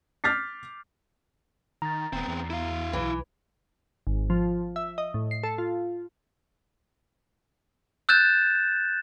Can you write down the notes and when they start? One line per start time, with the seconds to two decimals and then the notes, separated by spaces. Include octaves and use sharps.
0.24 D6 F6 G6 A6 B6 C7
1.82 D#3 A#5 A6
2.13 D#1 B3 C4
2.28 E2
2.50 E4 F5
2.93 B1 E3
4.07 G#1
4.30 F3
4.76 E5
4.98 D#5
5.14 A2
5.31 C7
5.43 A4
5.58 F4
8.09 E6 F#6 G6 A6 E7